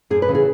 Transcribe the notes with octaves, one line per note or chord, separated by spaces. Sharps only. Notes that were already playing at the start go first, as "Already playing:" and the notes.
F#2 G#4
B4
C#3 E3
G#4